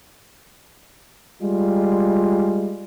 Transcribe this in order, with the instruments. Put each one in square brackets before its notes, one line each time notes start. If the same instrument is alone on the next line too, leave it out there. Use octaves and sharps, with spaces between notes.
[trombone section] G3 G#3 F4